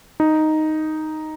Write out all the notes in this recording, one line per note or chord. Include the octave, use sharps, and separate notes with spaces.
D#4